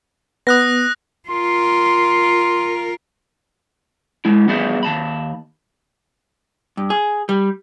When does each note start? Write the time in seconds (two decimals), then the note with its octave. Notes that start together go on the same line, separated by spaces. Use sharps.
0.47 B3 D#6 F#6 A#6
1.29 F4 A#4 C6
4.25 G#3 E4
4.48 G3 B3 G#4 D5 E5
4.83 D#2 A5 B5
6.77 G2
6.90 G#4
7.29 G3